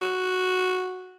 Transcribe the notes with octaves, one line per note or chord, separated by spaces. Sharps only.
F#4